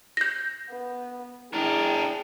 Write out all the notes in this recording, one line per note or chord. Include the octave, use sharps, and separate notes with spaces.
G6 A#6
B3
D4 E4 G#4 A#4 G5